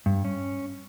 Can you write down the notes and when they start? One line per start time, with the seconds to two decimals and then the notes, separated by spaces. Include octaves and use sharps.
0.06 G2
0.25 C#4